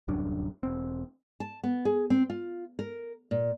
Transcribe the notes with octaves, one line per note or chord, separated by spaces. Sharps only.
D1 C2 F#2 D4
E1 C4
A5
B3
G#4
C4
F4
A#4
A#2